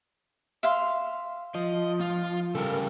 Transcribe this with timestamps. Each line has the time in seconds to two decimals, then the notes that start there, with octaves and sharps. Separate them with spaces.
0.63 E5 F5 C6
1.55 F3 D#5
2.01 F4
2.55 C#3 G3 A4 A#4